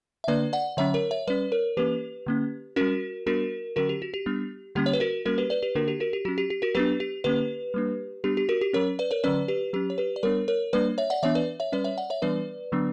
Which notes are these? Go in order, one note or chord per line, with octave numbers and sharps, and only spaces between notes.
E5
D3 A#3 D4 B4 D5
D5 F#5
D3 F#3 C#4 C#5 E5
A#4 C#5
C#5 E5
G3 C#4 B4 D5
A#4 C#5
E3 A#3 C#4 G4 B4
D3 A#3 C#4
G3 C#4 F#4 A#4
G3 B3 D4 F#4 A#4
D3 F#3 C#4 F#4 A#4
G4
F#4
G4
G3 B3 D4
D3 G3 A#3 C#4 G4
C#5
B4
F#4 A#4
G3 A#3 C#4 F#4 A#4
G4 B4
B4 D5
G4 B4
D3 A#3 D4 F#4 A#4
G4
F#4 A#4
G4
F#3 C#4 F#4
G4
G4
F#4 A#4
F#3 B3 D4 G4 B4
G4
D3 A#3 C#4 G4 B4
G3 A#3 D4
G3 B3 D4 G4
G4
F#4 A#4
G4
F#3 C#4 A#4 C#5
B4 D5
A#4 C#5
D3 F#3 C#4 B4 D5
G4 B4
F#3 C#4 G4
C#5
G4 B4
D5
G3 B3 D4 A#4 C#5
A#4 C#5
G3 A#3 D4 B4 D5
C#5 E5
D5 F#5
E3 B3 D4 C#5 E5
B4 D5
C#5 E5
G3 C#4 B4 D5
C#5 E5
D5 F#5
C#5 E5
E3 G3 B3 D4 B4 D5
D3 F#3 B3 D4